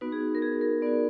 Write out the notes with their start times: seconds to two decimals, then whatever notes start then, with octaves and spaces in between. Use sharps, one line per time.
0.01 B3 D#4 F#4 B4
0.12 G#4
0.21 F#4
0.35 A#4
0.42 G#4
0.61 A#4
0.82 B3 D#4 F#4 D5